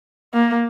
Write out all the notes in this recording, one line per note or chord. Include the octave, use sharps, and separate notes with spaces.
A#3